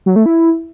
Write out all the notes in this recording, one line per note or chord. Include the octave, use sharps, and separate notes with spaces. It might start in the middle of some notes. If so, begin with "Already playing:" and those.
F#3
A3
E4